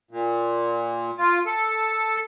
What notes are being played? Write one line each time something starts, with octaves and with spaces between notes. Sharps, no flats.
A#2
F4
A4